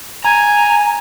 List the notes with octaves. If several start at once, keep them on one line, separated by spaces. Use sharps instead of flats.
G#5 A#5